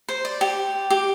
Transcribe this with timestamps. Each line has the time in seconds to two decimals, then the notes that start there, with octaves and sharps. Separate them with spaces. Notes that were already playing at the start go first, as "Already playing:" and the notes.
0.09 C5
0.25 D5
0.41 G4
0.90 G4